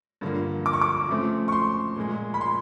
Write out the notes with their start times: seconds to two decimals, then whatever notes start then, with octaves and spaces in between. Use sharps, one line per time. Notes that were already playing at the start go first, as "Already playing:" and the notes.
0.21 G2 D3 F3 A#3
0.66 D6
0.73 C#6
0.81 D6
1.09 C#3 F3 A3 C4
1.48 C#6
1.52 C6
1.96 A#2 F3 G#3
2.34 B5
2.41 C6